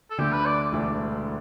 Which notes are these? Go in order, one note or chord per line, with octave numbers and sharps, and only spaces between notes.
A4
D2 D3 A3 G4
B4
D5
E1 D2 D3 A3 D4